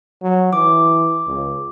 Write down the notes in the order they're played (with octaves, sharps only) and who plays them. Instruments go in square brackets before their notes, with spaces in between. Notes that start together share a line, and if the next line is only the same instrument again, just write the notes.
[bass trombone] F#3
[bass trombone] E3 [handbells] D6
[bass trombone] C#2